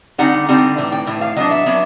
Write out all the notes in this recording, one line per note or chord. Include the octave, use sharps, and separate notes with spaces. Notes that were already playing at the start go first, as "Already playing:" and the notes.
D3 G3 C4 D#4 F#5
D3 G3 C4 D#4
A2 E3
G5
A2 E3
F5
F#3 B3 D4 D#5
E5
F#3 B3 D4